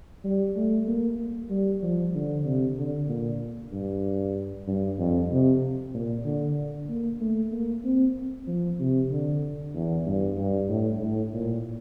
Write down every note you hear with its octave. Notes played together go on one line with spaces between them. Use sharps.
G3
A3
A#3
G3
F3
D3
C3
D3
A#2
G2
G2
F2
C3
A#2
D3
A#3
A3
A#3
C4
F3
C3
D3
E2
G2
G2
A2
A2
A#2